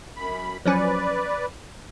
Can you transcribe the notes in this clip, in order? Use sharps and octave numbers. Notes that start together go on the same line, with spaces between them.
F#2 B5
F3 F#3 C#4 B4 D5